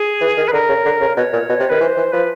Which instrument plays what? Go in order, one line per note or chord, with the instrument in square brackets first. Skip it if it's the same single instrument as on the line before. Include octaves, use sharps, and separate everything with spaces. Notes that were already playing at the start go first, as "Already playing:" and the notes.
Already playing: [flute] G#4
[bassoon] E3
D#3
[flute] B4
[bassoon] D3 [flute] A#4
[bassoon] C#3
D3
C#3
[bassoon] B2 [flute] C#5
[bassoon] A#2
B2
C3
[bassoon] D#3 [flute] B4
[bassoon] E3 [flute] C5
[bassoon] E3
[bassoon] F3 [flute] B4